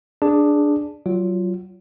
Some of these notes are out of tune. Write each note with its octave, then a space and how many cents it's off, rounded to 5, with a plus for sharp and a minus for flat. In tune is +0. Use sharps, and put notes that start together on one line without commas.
D4 +0 G#4 +0 D5 +0
F#3 +25 F4 +0